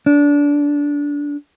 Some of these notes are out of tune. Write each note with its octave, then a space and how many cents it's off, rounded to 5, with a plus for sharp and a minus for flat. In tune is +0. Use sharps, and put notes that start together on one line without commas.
D4 -20